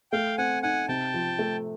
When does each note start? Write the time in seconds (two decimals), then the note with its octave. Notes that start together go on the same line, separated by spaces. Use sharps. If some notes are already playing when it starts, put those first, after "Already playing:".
0.12 A3 F5 G5
0.38 C4 F#5 G#5
0.63 D#4 F#5 G#5
0.88 C3 G5 A5
1.14 F3
1.39 A3